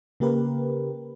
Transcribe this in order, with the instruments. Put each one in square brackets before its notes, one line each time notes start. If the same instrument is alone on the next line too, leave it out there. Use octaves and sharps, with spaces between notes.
[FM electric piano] C#3 A#3 G4 A#4 B4